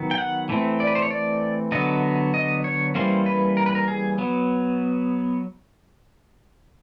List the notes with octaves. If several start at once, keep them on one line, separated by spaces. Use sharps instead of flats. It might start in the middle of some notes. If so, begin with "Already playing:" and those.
Already playing: D#3 F#3 B3
G5
F#5
E3 A3 C4
D5
B4
C5
C#5
D5
D3 F#3 B3 D#5
D#5
C#5
E3 G3 A#3 C#4 C5
B4
A#4
B4
A#4
G#4
F#3 B3